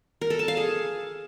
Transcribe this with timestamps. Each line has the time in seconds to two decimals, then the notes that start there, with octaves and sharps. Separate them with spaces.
0.21 A#4
0.30 A4
0.39 A5
0.48 F5
0.57 G#4